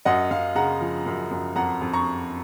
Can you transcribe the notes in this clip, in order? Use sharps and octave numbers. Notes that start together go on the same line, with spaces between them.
F#2 D#5 F#5
F#2 F5
C#3 F#5 A#5
F3
F#2
F#2
F2 F#5 A#5
F2
A#5 C#6